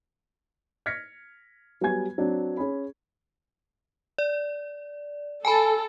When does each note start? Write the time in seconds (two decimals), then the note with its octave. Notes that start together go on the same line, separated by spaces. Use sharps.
0.86 F6 G#6 A#6 B6 C#7
1.81 F#3 G3 B3 B4 G#5 G#6
2.18 F#3 C4 D4
2.57 C#4 G#4 B5
4.18 D5
5.45 A4 G#5 A5 B5